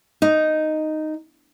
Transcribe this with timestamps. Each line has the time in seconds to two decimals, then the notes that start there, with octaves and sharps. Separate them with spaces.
0.22 D#4